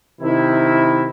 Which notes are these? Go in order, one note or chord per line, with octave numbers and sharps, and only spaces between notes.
C3 D#3 E4